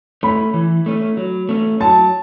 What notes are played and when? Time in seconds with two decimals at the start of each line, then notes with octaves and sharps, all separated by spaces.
0.23 A3 C#4 B5
0.54 E3
0.86 A3 C#4
1.17 F#3
1.49 A3 C#4
1.80 F#3 A5